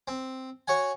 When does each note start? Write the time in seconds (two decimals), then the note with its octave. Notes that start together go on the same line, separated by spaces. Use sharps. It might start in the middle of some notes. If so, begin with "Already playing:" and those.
0.08 C4
0.68 F#4 C#5 F#5 G#5